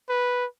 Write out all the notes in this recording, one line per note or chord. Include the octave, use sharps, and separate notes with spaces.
B4